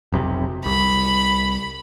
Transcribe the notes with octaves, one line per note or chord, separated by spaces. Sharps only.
F1 B1 C3
C2 B5